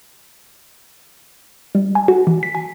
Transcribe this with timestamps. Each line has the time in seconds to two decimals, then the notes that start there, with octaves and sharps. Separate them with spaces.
1.75 G3
1.95 G#5
2.08 F#4
2.27 E3
2.43 B6
2.55 G#5